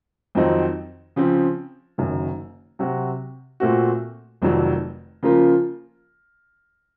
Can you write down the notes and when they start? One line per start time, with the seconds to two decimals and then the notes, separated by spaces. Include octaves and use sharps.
0.35 F2 D#3 F#3 C4 D#4
1.16 C#3 F3 C4
1.98 F#1 F#2 D#3
2.79 C3 F#3 C4 F#4
3.60 A#2 A3 C4 F#4
4.42 F1 F2 D#3 F#3
5.23 C#3 F3 A#3 F4 A#4